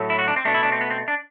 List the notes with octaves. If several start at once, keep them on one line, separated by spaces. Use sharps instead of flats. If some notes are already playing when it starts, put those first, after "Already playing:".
Already playing: A2 F#3 A3
E4
F#4
D4
C4
B2 A3 D4
E4
D4
C4
B3
C4
D4